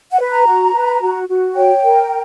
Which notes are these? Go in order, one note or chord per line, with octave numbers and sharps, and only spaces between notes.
F#5
B4
A#5
F#4
B4
F#4
F#4
C#5 G5
A#4